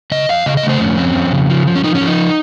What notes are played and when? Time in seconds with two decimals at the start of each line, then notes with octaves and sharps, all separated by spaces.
0.12 C#3 D#5
0.29 F2 F5
0.46 C#3 D#5
0.57 D#5
0.63 A3
0.69 C5
0.80 F2 C#4
0.98 C4
1.15 F2
1.32 C#3
1.50 F3
1.67 F3
1.75 C#4
1.84 F3 D#4
1.95 C#4
2.01 F3
2.07 D#4